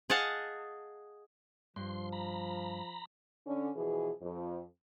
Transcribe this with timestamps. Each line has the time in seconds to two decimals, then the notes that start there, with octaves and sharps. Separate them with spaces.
0.10 G#4 D#5 F5 F#5 A5
1.76 G2 F3 C6
2.13 A#5 B5
3.47 D3 C#4
3.76 B2 E3 F3 G#4
4.22 F2